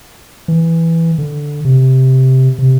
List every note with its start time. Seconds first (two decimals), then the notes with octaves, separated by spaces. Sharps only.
0.48 E3
1.18 D3
1.65 C3
2.59 C3